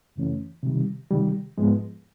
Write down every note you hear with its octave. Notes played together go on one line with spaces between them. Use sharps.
F#2 C#3 E3 A3 C#4
C3 D#3 G3
C3 D#3 G3
G#2 F3 G#3 B3